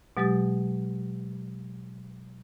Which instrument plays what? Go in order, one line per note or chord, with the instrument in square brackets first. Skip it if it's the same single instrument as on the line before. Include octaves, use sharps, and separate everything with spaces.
[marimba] B2 F#3 G#3 G4 D#6 A6